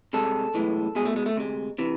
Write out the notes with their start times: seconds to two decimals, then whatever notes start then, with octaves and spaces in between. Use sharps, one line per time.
0.13 C2 C3 G#3 A4
0.54 B1 A2 E3 G#3
0.95 C2 B2 G#3 G#4
1.05 A3
1.16 G#3
1.26 A3
1.36 D2 C3 G#3
1.78 C3 E3